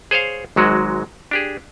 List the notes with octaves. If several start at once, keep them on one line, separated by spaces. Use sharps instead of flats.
G#4 C5 C#5 F5
G#1 G#2 F#3 G#3 F#4
D4 G4 G#4